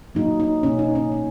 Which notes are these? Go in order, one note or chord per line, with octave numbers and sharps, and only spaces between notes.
A#2 F#3 A#3 D#4
D#4
B2 A#3 C#4
D#4
C#4
A#2 A#3 D#4